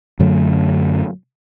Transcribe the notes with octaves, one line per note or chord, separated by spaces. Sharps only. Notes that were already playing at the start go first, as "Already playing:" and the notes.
F#2 D3 F#3 A3